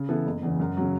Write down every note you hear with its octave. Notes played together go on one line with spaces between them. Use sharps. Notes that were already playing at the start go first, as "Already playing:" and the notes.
Already playing: C#3
E3 B3 E4 A4
F#1
E2 C#3 E3
F#2
C#3 F#3